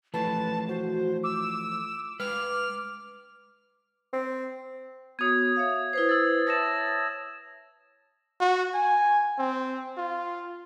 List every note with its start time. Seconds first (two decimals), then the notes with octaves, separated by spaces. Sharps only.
0.14 E3 F3 A3 B4 A5
0.69 F#4 C5
1.24 D6 E6
2.20 G#3 B4 F6
4.13 C4
5.19 B3 F#4 C#5 D#6 G#6
5.56 C#5 E5 F5
5.93 E4 B4 C5
6.09 E6 A6
6.47 C#5 E5 A5 A6 A#6 E7
8.41 F#4
8.74 G#5
9.38 C4
9.97 F4